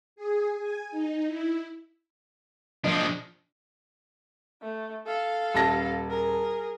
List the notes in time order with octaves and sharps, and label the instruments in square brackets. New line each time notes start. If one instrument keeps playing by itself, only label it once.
[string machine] G#4
G#5
D#4
E4
[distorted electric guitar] F3 D4 [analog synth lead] D#5
[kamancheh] A3
A4 F5
[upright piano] D#1 A5 A#6
[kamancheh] G#4 A#4